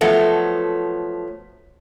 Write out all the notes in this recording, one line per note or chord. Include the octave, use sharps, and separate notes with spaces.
F3 F#3 A3 B3